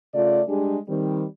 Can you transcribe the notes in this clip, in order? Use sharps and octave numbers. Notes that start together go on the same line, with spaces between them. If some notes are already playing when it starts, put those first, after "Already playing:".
C#3 A3 F4 D5
G3 G#3 D4 G4 G#4
D#3 G3 C4